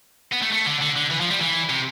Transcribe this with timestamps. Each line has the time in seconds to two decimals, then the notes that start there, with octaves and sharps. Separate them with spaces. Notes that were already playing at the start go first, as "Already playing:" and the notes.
0.32 B3
0.42 A3
0.52 A3
0.66 D3
0.81 D3
0.96 D3
1.10 E3
1.20 F3
1.31 G3
1.41 E3
1.69 C3